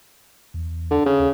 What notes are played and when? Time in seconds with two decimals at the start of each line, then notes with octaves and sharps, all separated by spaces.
0.54 E2
0.91 D3
1.05 C#3
1.19 D#2